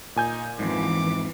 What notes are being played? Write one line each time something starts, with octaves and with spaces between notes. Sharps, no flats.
A#2 D#4 G#5 G6
F2 G#2 E3 D6